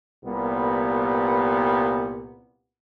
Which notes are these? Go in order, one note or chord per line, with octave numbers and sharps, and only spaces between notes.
C2 A#2 G3 B3